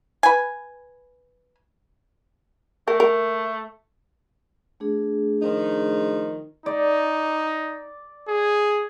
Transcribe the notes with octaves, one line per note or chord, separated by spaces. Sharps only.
B4 G#5
A3 A#4
A#4
A3 D4 G#4
D#3 F3 D#4
D#4 D5
G#4